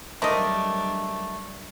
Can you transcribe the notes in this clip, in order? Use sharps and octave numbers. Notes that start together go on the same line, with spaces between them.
F#3 G3 A3 A#3 C4 D4 A#4 D#5